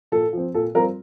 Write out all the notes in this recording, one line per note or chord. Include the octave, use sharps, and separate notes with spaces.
A#2 A4
F3 C4
A#2 A4
G3 C4 F4 A#4